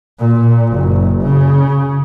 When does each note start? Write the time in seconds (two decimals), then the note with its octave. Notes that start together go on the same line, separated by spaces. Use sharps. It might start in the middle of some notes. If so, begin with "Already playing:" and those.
0.20 A#2
0.74 F#1
1.22 C#3